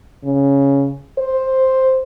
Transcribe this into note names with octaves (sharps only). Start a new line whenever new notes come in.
C#3
C5